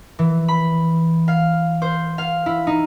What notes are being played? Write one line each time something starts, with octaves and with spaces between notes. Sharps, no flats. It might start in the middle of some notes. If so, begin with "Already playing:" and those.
E3
B5
F5
C5
F5
E4
D#4